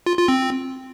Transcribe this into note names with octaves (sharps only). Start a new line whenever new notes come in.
F4
F4
C4